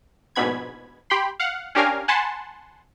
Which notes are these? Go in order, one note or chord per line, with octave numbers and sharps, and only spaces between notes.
A#1 G#2 B2 B3 B5 G#6
G4 G5 B5 C6
F5 F#5
C#4 D4 G4 A#4 F5 G#5
F#5 G#5 A5 B5 C6